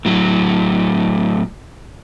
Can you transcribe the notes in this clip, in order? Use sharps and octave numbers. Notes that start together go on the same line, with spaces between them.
A2 F#3